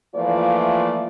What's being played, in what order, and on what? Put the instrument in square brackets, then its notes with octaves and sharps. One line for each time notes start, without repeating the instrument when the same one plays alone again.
[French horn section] E3 F3 A3 A#3 F4 D5